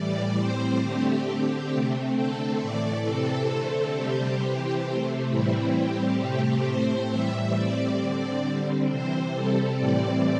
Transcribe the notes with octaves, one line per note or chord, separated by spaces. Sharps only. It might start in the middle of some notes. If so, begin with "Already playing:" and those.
Already playing: A2 E3 G3 D5
A2 G3 C4 C5
D3 A3 C4 G4
D3 C4
C3 A3 C4
D3 A3 C4 A4
A2 E3 A3 D5
C3 E3 C4 A4
D3 A3 C4
C3 G3 C4 G4
C3 E3 C4
C3 A3 C4
A2 E3 G3 C4 E4
A2 G3 C4 G4
C3 A3 C4 G4
A2 A3 C4 C5
A2 E3 G3 E5
A2 G3 C4 D5
D3 C4
D3 G3 C4
C3 E3 C4 C5
C3 G3 C4 A4
A2 E3 G3 C4 D5